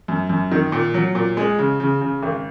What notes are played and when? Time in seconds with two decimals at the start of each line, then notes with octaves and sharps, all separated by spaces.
0.08 F#2
0.29 F#2
0.52 D#3
0.72 A#2
0.94 F#3
1.15 A#2
1.37 G#3
1.59 C#3
1.80 C#3
2.01 C#3
2.23 G#1